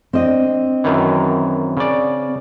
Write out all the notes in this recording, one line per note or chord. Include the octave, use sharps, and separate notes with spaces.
C4 D4 D#5
F#2 D#3 E3
C#3 D5